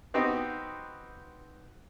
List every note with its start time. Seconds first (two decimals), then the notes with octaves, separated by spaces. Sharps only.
0.14 B3 C4 D#4 F#4 G4